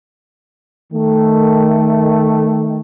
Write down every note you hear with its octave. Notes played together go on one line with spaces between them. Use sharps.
D#3 A3